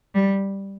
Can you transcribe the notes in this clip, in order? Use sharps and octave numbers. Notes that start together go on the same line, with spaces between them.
G3